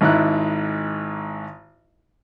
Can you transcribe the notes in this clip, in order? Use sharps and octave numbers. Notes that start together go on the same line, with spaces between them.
G#1 G#2 E4 F#6